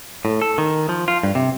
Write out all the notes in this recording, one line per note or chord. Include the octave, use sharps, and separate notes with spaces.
A2
A4
D#3
F3
F4
G2
C3